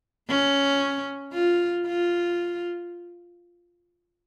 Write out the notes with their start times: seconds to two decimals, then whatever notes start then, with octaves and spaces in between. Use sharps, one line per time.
0.29 C#4
1.33 F4
1.86 F4